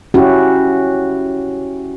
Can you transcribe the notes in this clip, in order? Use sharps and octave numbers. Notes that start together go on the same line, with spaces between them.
C#4 E4 F#4 G4